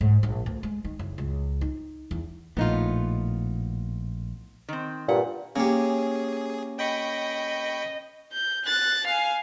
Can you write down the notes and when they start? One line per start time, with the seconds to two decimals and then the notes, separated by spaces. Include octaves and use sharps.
0.01 G#2
0.23 A#1
0.46 D2
0.63 G#3
0.84 D#3
0.99 F#1
1.18 C#2
1.61 D#4
2.11 E2
2.57 A#1 A2 B3 D#4 F4
4.68 D#3 C4
5.09 G2 A#2 F#5
5.56 A#3 C#4 G4 G#4
6.79 D#5 G5 B5 C#6
8.33 G6
8.65 F#6 A6
9.07 F5 G#5